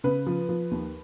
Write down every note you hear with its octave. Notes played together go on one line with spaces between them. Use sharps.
C#3 B4
F3
F3
D#2